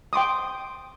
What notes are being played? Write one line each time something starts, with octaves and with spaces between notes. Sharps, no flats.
G5 C6 D6 D#6